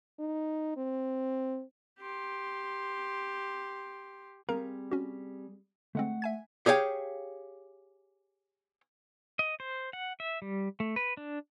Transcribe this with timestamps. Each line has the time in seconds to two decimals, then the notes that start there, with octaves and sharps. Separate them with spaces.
0.20 D#4
0.76 C4
1.99 G4 C6
4.49 G3 C4 G#4 A#4 F5 A#5
4.91 C#4 F#4
5.95 D3 G#3 A3 C4 F#5
6.22 E5 G#5 G#6
6.66 G4 G#4 C#5 F5 G5
9.39 D#5
9.60 C5
9.93 F#5
10.20 E5
10.42 G3
10.80 A3
10.96 B4
11.17 D4